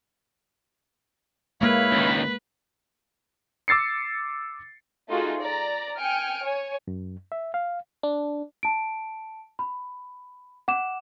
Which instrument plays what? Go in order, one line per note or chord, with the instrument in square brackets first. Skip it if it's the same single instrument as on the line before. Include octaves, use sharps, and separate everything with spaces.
[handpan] G#3 A#3 [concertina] E4 C#5 F5 [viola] B4
[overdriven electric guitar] C#2 D#3
[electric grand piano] D6 E6 A6 C7 C#7
[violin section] A3 D#4 F4 F#4 G#4
D5 A#5
G5 G#5 F6 C#7 D7
C#5 G#5
[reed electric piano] F#2
E5
F5
[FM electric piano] D4
[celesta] A5 D7
B5
F#5 D6 E7